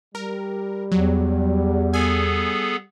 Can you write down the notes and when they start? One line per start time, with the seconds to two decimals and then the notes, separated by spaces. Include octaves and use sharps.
0.15 G3 A#4
0.92 E2 F#3
1.94 B3 G#4 A4 G#5